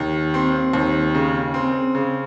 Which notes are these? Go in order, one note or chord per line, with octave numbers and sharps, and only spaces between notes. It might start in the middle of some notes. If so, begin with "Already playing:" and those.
Already playing: D#2
C4
D#2
C#3
C4
C#3